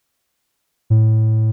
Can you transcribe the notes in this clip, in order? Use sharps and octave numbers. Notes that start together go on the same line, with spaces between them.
A2